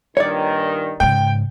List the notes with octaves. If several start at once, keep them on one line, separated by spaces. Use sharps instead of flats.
G2 A#2 D#3 C#5 D5
G#2 C#3 G5